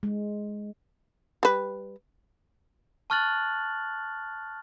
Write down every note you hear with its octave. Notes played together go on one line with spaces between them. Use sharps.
G#3
G3 B4
A5 C#6 F6 F#6 A6 F#7